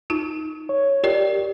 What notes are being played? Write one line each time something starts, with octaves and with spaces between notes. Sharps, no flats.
D#4 F4
C#5
F4 G4 A#4 D5